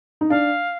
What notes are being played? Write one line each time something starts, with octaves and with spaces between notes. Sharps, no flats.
D#4
D4 F5